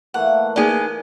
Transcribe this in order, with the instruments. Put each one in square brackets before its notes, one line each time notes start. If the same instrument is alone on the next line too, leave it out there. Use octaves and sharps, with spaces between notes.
[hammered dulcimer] E3 A3 A#3 [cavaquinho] F#5
[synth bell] A#3 D#4 D5 [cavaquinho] G#4 B4 [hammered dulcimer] G#5 D6